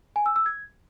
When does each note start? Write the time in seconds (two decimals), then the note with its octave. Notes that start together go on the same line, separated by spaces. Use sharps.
0.16 G#5
0.26 E6
0.36 E6
0.46 G#6